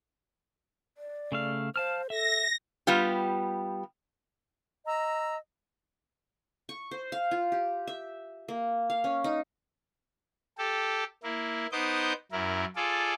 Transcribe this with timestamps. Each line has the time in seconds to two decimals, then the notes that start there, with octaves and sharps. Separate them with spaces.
0.97 D5
1.32 C#3 A3 F5
1.76 C5 F5 A5 F6
2.10 A4 E5 A#6
2.87 G3 B3 F4 G4
4.86 D#5 A#5 E6
6.69 C#6
6.91 C5
7.12 F5
7.31 F4
7.52 G4
7.87 E5
8.48 A#3
8.90 F5
9.04 C#4
9.24 D#4
10.58 G4 A4
11.23 A#3 E4
11.72 B3 D#4 C5 D#5 D6 G6
12.32 F#2 E4 A#4
12.76 F4 G#4 A4 D5